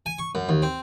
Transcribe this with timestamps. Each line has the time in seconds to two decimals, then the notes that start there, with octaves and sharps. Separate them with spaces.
0.06 G#5
0.18 C#6
0.35 F#2
0.49 D#2
0.62 C4